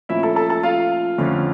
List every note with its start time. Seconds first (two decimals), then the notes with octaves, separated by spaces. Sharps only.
0.09 A#2 F3 A3 C#4 E4 E5
0.23 A4 A5
0.36 A4 A5
0.50 A4 A5
0.63 F4 F5
1.18 F2 D3 A3 C#4